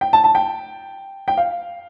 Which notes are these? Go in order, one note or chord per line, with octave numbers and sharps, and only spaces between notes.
G5
A5
A5
G5
G5
F5